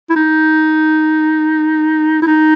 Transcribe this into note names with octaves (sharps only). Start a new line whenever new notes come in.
E4
D#4
E4
D#4